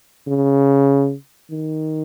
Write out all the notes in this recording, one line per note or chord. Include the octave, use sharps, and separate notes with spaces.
C#3
D#3